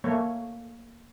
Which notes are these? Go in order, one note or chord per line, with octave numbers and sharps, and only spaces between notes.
A3 A#3 C#5